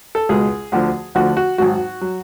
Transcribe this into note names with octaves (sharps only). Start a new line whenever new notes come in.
A4
C#2 B2 G#3 G#4
D2 D3 F3
D2 D3 F3 F#4
F#4
G#1 G#2 F#3 F#4
F#3